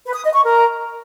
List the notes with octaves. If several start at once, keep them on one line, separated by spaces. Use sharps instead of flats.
B4
D#6
D#5
C#6
A#4